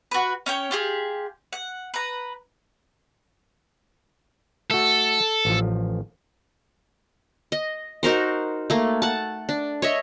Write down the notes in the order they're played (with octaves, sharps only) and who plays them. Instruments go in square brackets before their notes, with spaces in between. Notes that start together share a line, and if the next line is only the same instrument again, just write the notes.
[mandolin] F#4 B4
C#4 C#5 G5
F4 G4 G#4
F#5
B4 A#5
[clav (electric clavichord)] A3 F#4 [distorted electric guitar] A4
[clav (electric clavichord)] A1 F3
[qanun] D#5
D#4 F#4 A#4 C5
A3 A#3
F#5 A5
D4
C#5 D#5 E5